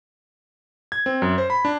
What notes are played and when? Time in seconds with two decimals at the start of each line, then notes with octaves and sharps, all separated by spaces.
0.92 G#6
1.06 C4
1.22 F#2
1.38 C5
1.50 B5
1.65 D4